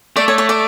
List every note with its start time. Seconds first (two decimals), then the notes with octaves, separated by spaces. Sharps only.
0.16 A3 D5
0.28 C#5
0.38 C#5
0.49 D5